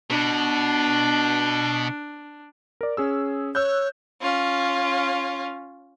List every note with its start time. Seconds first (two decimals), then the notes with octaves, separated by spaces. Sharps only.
0.10 B2 D4
2.81 A#4 D5
2.97 C#4 G#4 E6
3.55 C#5 E6 F#6 G6
4.21 C#4 F4